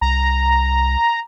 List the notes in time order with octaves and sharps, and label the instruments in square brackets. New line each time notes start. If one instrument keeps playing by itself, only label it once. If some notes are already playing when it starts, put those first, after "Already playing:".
[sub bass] C2 [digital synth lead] A#5